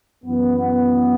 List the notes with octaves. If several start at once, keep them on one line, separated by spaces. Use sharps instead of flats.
F#2 E3 B3